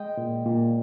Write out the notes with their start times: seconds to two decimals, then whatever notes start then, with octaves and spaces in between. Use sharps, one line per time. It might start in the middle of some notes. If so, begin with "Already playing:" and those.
Already playing: G#3 D#5 G5
0.17 A#2
0.46 A#2